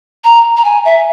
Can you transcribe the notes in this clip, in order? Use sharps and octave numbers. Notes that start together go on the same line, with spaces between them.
A#5
A#5
G#5
E5